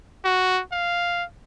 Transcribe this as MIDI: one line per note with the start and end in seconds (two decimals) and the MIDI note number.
0.25 0.61 66
0.72 1.24 77